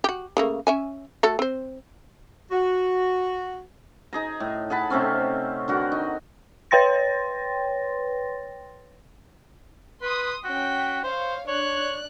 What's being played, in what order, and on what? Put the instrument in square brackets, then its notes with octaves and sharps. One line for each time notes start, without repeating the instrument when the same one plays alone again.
[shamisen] F#4 G4
C#3 A3 A#3
C#4 E5 G#5
A3 F#4 A4
C4 C5
[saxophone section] F#4
[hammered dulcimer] D#4 G#4 A#5
A2
G#4 F#5 A5 B5
C3 A3 C4 C#4
D3 F#4 A#4
D#4
[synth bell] B4 C#5 G5 C6 A6 A#6
[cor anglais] B4 [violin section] C6 D#6
[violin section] C#4 G5 B6 [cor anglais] F#4
[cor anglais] C5 [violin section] C#5 F5
[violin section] D4 D5 F#6 [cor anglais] C#5